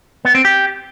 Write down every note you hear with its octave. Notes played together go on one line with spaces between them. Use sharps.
B3
C4
G4